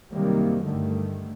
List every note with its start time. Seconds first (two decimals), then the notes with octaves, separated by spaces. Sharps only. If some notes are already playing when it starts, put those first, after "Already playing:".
0.12 F#2 C3 D#3 F#3 G3 A#3
0.64 G2 D3 D#3 G3 A3